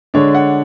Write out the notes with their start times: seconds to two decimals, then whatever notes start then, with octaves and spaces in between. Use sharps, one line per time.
0.14 D3 G#3 D4 C#5
0.35 F#5